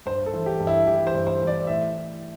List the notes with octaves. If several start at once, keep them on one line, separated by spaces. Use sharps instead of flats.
G2 C5
A4
E3
G4
G2
E4
E3 G4
C5
G2
C5
E3
D5
A2 E5